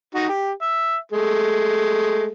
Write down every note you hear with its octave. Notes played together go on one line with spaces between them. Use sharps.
D#4 F#4
G4
E5
G#3 A3